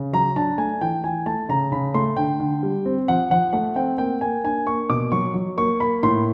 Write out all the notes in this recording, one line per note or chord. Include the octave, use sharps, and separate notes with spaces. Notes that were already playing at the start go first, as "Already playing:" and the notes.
Already playing: C#3
F#3 A#5
D4 A5
A3 G#5
E3 G5
E3 G#5
A3 A5
C#3 A#5
C#3 B5
A3 C6
D3 G5
D3
G3
C4
F3 F#5
F3 F#5
A3 F#5
C4 G5
A#3 G5
A#3 G#5
D4 G#5
A#3 C#6
B2 D6
F#3 C#6
F#3
A#3 C#6
A#3 B5
A2 C6